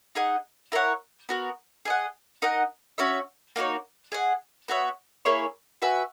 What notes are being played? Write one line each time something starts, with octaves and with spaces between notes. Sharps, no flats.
D#4 G#4 D#5 F#5
E4 A#4 C#5 F#5
B3 F#4 A#4
G#4 D#5 F#5
D#4 A#4 D#5 F#5
C#4 F#4 C#5 E5
A#3 D#4 F#4 C#5
G#4 D#5 F#5
B3 F#4 C#5 E5
A#3 E4 G#4 C#5
F#4 B4 E5 G#5